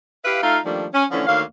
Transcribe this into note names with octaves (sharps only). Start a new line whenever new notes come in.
E4 G4 B4 E5 F5
A3 D#4 F4 A4 F5
D#3 F3 G3 A3 A#3 D4
C#4
D3 E3 F3 A3 C#4 D4
D2 D#3 A#3 C#5 F5